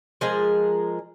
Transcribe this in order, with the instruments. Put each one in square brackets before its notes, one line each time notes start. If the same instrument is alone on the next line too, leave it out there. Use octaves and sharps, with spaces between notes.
[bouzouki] F3 G#3 A#4